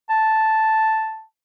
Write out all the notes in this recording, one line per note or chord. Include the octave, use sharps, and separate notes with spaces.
A5